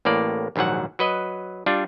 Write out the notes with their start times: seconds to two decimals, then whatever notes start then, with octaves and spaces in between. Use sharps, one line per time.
0.05 A1 A2 A#3 D5
0.56 A#1 D#2 G#2 F#3 F#5
0.99 F#3 B4 D#5
1.66 G3 D4 F4